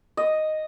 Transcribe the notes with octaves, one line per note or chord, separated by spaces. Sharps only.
D#5